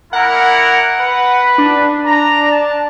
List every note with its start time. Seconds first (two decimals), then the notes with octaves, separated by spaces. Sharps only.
0.13 A#3 E4 A#4 F#5
1.00 B4
1.58 D4
2.06 A#5
2.51 A5